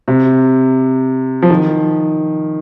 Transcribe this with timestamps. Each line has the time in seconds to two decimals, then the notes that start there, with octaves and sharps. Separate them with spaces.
0.08 C3
1.42 F3
1.50 D#3